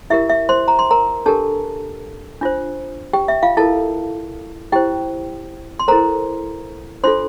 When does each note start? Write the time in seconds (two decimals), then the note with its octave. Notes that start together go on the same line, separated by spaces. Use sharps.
0.10 E4 G4 A#4 E5
0.29 E5
0.49 C5 C6
0.68 A#5
0.79 C6
0.91 A#4 A#5
1.26 D4 G4 A4 A#4 A5
2.41 D4 F4 C5
3.13 G4 G5
3.28 E5
3.43 F4 F5
3.57 E4 A4 A#4 A5
4.72 E4 G4 C5 G5
5.79 C6
5.88 E4 A4 A#4 C5 A#5
7.04 D4 F4 A4 C5 C6